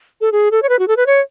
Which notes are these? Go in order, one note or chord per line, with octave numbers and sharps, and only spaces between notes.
A4
G#4
A4
C#5
B4
F#4
A4
B4
C#5